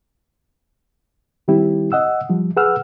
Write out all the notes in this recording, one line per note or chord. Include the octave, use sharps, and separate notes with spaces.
D#3 G3 C4 E4 G4
D#5 F#5 E6
F3 G3
G#4 B4 F#5 E6 F6